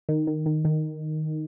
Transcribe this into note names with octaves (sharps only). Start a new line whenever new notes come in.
D#3
D#3
D#3
D#3